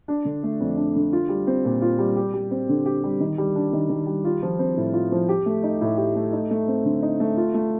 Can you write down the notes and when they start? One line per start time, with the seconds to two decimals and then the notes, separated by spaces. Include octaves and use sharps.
0.08 D4
0.25 D3
0.43 A3
0.61 F2
0.77 D4
0.96 D3
1.13 F4
1.29 G3
1.47 C4
1.65 A#2
1.82 F4
1.99 G3
2.16 G4
2.34 G3
2.51 C4
2.69 D3
2.86 G4
3.04 G3
3.20 D#3
3.38 G3
3.55 D4
3.73 D#3
3.89 D#3
4.07 G3
4.25 F4
4.43 F3
4.59 C4
4.77 A2
4.93 F4
5.12 F3
5.29 G4
5.46 A3
5.63 D#4
5.81 A2
5.97 G4
6.15 A3
6.32 D#4
6.51 A3
6.68 C4
6.85 D3
7.02 D#4
7.20 A3
7.37 F4
7.54 A3